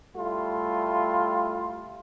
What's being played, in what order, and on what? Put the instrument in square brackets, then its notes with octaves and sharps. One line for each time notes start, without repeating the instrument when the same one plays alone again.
[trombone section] G3 A3 E4 F4